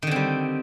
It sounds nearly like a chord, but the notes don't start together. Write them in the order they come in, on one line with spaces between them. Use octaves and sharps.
D#3 D3 C4 G3